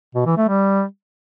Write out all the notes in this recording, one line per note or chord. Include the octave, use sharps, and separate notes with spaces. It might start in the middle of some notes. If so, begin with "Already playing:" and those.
B2
E3
A3
G3